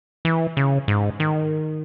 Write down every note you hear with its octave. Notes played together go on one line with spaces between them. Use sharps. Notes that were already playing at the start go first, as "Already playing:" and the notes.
E3
C#3
G#2
D#3